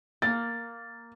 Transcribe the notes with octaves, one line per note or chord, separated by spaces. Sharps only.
A#3 A6